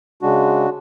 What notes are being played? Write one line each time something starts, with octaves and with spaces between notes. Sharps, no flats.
C#3 G#3 D4 F#4